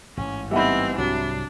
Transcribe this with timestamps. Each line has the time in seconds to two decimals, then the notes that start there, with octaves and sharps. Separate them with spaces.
0.17 A1 G#2 C#4
0.51 E3 G3 B3 C4 D#4 E5 F#5 B5
0.98 C2 G#2 C3 F#3 D4